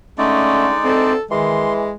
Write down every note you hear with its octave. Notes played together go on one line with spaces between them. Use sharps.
D3 G#3 A3 C#4 D#4 D5
D2 C4 A4
D#3 E3 G#3 C6